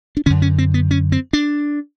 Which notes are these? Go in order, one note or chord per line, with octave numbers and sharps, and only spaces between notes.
D4
F#2 D3 C#4
C#4
C4
B3
C#4
C4
D4